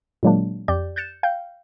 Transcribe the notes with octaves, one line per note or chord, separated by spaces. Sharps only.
A#2 D3 F#3 G#3 A#3 D4
F2 G4 D5 G6
F#6 G6 A6 C#7 E7
F5 G5 G6